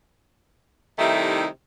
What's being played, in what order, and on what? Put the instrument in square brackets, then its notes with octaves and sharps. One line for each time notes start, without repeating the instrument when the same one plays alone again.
[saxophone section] C3 D#3 G3 A3 D#4 E4